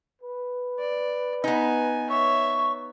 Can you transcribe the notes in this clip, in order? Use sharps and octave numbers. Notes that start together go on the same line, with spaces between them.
B4
D5
B3 D#4 G#5
C#5 E5 C#6